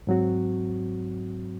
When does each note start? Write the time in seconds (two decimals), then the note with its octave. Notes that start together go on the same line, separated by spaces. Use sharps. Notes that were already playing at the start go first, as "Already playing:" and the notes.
0.07 G#2 F#3 C4 F#4